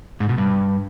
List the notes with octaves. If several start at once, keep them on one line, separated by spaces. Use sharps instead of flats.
G#2
B2
G2